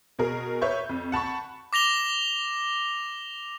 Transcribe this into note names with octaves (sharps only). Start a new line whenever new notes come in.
B2 G#4 A#4
B4 C#5 E5 C#6 G6
F2
F#5 A5 B5 C#6
D6 A#6 F7 G7